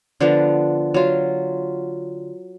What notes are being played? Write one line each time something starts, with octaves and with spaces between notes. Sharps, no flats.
D3 F3 B3 D4
F#3 F4